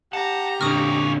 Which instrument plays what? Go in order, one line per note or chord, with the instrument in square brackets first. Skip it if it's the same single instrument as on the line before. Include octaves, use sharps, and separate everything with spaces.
[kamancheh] G4 A#5 [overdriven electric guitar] F#5 [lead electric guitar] A5
[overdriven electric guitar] A#2 D3 [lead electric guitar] C#4 D5 [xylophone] D#6 F6